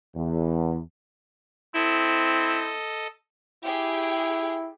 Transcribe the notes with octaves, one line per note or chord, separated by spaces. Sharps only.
E2
C4 E4 A4 D#5
E4 G4 G#4 G5